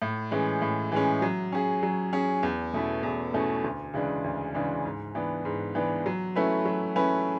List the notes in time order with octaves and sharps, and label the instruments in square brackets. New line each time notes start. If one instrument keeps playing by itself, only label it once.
[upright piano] A2
E3 G#3 C#4
A2
E3 G#3 C#4
F#3
C#4 G#4
F#3
C#4 G#4
E2
B2 A3 C#4 E4
E2
B2 A3 C#4 E4
D2
C#3 E3 G#3 D4
D2
C#3 E3 G#3 D4
G#2
E3 B3 D4
G#2
E3 B3 D4
F#3
A3 C#4 E4 B4
F#3
A3 C#4 E4 B4